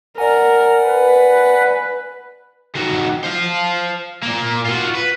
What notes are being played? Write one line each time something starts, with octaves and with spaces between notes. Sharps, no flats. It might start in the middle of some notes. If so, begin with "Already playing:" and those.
A#4 D5 F#5 G#5
B4
D#3 F#4
C5 F5
A#2 A#3
F4 F#4
B4